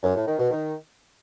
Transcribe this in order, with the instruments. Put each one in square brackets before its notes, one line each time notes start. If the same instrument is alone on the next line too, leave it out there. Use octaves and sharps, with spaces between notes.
[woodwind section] F#2
A2
D#3
B2
D#3